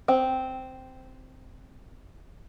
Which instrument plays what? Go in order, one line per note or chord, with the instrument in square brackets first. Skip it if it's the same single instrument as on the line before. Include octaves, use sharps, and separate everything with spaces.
[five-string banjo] C4 G5